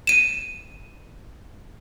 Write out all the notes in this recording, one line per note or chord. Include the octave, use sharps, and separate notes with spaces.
D#7 E7